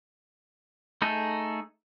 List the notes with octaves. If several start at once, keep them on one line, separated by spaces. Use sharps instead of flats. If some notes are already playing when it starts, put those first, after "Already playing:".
A3 D#4 G#4 A4